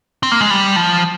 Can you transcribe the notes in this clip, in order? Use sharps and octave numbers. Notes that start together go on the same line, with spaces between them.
C4
A#3
G#3
G3
F3